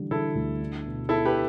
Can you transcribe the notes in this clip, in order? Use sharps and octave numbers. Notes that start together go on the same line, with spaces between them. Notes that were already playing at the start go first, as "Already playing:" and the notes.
Already playing: D3 E3 G3
D3 E4 A4
D2
D4
B2
B3 E4 A4
G4 B4